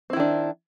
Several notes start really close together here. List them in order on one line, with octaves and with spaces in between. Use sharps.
C4 E4 D#3 D4